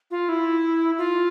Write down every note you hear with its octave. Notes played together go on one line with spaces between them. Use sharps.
F4
E4
F4